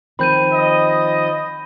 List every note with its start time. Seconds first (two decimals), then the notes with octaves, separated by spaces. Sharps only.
0.19 D#3 F3 C4 B5 G6 D#7
0.52 D#5